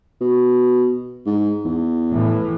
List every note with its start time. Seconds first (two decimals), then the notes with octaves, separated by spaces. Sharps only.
0.21 B2
1.26 G#2
1.65 E2
2.10 A2 E3